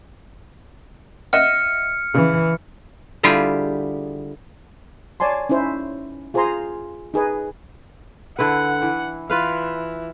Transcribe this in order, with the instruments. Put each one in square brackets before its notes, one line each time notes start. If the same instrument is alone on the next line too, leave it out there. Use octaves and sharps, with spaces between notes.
[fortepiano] D#5 E5 F#5 [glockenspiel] F6 C#7
[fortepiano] C#3 [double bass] E3
[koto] D3 G3 E4 F4 G4 G#4
[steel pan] C#5 D5 G#5 A5 C6
C#4 D#4 E4 C5
F4 G#4 C5 G#5 A#5 C6
D#4 G#4 B4 D#5
[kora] D3 E4 B4 [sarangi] F#5
[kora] E3
[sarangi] E3 [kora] F4 B4 F5